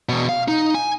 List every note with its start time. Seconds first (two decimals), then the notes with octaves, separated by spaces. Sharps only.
0.09 E2 B2
0.29 F5
0.48 D#4
0.74 G#5